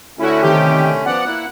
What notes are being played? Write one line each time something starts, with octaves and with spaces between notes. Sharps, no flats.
D3 A3 C#4 E4 F#4
C3 D#3 G4
F3 B3 D5 F#5
A#3 E4